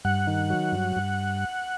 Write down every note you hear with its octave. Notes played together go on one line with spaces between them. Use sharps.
G2 F#5
D#3
F#3
G2
G2